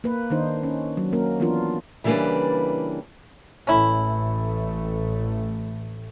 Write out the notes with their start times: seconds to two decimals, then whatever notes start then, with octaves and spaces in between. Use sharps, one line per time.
0.04 A#3 B4
0.30 D#3 D4 D#4 C5
0.63 C#4
0.97 F#3
1.13 A#3 C#4 A#4
1.40 E3 B3 D4 F4 A#4
2.04 C#3 E3 G3 A#3 D4 B4
3.67 A1 A2 A3 C#4 E4